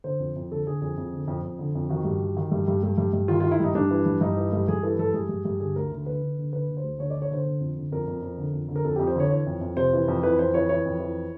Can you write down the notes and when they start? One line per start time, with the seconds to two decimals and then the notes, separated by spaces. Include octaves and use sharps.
0.04 D3 C5
0.20 F2
0.36 F2
0.50 D3 A4
0.66 D3 G#4
0.81 F2 G#4
0.98 F2
1.13 D3
1.28 F2
1.43 F2
1.59 D3
1.75 F2
1.89 D#3 F#4
2.05 G2
2.21 D#3
2.37 D#3
2.51 G2
2.68 G2
2.83 G2
2.98 G2
3.13 G2
3.28 D#3 F4
3.40 D#3 F4
3.51 E4
3.60 G2 D#4
3.75 G2 D4
3.91 E3
4.06 G2
4.21 G2 D#4
4.37 E3
4.53 G2
4.68 G2 G#4
4.83 E3 A4
4.99 G2 A4
5.14 G2 G#4
5.29 G2
5.45 G2
5.60 D3 G#4
5.76 D2 A#4
5.91 D3
6.06 D3 B4
6.22 D3
6.38 D3
6.53 D3 B4
6.68 D3
6.77 C5
6.84 D2
6.99 D3 C#5
7.10 D3 D5
7.22 C#5
7.31 D3 C5
7.45 D3
7.61 F2
7.76 D3
7.92 F2 A#4
8.08 F2
8.22 F2
8.38 D3
8.53 F2
8.69 D3
8.76 A#4
8.85 F2 A4
8.96 F2 G4
9.07 C5
9.16 D3 C#5
9.30 E3 C#5
9.46 F2
9.61 F2
9.77 C3 C5
9.93 E3
10.08 F2
10.23 E3 B4
10.39 F2 C5
10.54 E3 C#5
10.69 E3 C#5
10.85 F2
11.00 E3